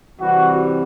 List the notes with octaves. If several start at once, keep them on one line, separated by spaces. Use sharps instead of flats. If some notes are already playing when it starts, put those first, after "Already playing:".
C3 E3 G3 F#4